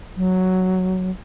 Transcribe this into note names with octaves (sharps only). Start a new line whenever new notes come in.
F#3